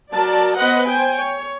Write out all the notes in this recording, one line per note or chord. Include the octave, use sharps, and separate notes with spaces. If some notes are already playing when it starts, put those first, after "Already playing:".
F#3 A#4 D5 A5
B3 B4 C5 D#5 F#5
C5 G5 G#5
C#5